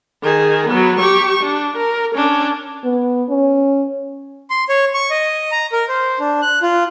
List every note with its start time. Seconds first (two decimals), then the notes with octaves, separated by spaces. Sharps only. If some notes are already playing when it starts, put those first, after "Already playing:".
0.23 D#3 G#4
0.69 F#3 B3
0.99 G4 C#6
1.43 D4
1.77 A#4
2.15 C#4 D4
2.84 B3
3.29 C#4
4.50 C6
4.69 C#5
4.94 C#6
5.11 D#5
5.52 A#5
5.72 A#4
5.89 C5
6.19 D4
6.42 F#6
6.62 F4